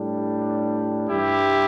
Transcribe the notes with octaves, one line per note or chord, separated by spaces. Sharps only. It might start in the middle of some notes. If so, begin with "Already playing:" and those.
Already playing: A2 G3 D4
G2 E3 G3 E4 G4